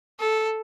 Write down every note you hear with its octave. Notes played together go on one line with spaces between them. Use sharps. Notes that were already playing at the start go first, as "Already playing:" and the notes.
A4